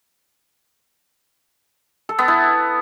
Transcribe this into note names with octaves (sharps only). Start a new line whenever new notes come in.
A4
B3
E4